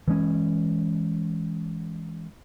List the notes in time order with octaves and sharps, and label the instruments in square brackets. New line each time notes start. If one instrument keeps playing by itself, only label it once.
[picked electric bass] E3 G#3 C#4